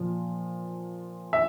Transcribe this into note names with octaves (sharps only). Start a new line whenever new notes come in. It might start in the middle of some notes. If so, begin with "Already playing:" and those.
Already playing: A#2 F3
E5